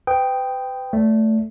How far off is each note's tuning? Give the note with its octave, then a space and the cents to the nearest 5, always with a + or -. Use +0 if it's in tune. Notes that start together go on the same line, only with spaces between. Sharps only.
B4 +35 G5 +0 D#6 +0
A3 +0 D5 -30